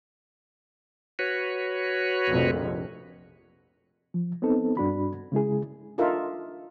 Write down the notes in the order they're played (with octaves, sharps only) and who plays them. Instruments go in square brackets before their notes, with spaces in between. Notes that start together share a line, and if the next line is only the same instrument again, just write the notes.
[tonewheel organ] F#4 B4 C#5
[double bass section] F1 A#1 F2
[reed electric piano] F3
B3 C4 D#4 A4
G2 D4 F#4 B5
C#3 G#3 E4 G#4
[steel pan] D4 D#4 F4 A4 A#4 E5